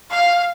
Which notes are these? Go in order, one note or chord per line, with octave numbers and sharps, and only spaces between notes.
F5